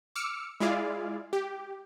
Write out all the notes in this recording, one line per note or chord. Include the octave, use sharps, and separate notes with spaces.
D6 E6 F6 C#7
G#3 E4 F4 G#4 D5 F5
G4